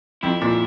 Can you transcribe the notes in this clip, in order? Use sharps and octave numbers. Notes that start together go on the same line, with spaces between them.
F2 E4
A#2